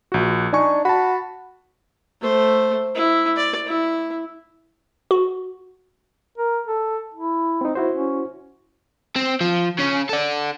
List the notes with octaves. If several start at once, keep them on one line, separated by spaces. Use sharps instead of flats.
A#1 F#4
D4 D#4 G#5 C#6
F#4 A5 B5
A3 C5
E4
D5
E4
F#4
A#4
A4
E4
C4 D#4
E4 F#4 C5
C#4
C4
F3
C#3 C#4
A4 D5